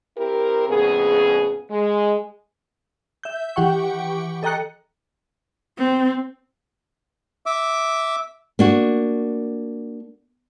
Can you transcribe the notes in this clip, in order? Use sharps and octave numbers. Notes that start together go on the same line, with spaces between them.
C4 E4 G4 A#4
F2 A2 C#3 B3 G#4
G#3
E5 G6
E3 G4 F#5 G5 C#6
A4 D#5 G5 A#5 F#6 C#7
C4
E5 D6
A#3 D4 F#4